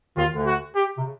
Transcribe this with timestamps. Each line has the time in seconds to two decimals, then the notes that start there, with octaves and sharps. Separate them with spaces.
0.17 D#2 D#3 F4
0.32 D2 D3
0.46 F#4
0.75 G4
0.98 C3
1.04 C#3